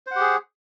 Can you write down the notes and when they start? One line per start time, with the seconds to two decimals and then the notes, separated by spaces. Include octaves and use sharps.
0.07 C5
0.11 F#5
0.16 G4
0.20 G#4